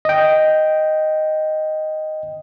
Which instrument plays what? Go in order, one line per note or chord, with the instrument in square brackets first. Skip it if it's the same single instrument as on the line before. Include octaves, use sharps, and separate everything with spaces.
[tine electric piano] D#5 G5